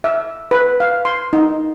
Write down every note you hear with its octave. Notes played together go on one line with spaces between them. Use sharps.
E5
B4
F5
C6
D#4